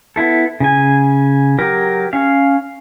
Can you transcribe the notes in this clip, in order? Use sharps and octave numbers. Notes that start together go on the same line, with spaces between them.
B3 E4 A4
C#3 G#5
F#3 G4 A#4
C#4 F5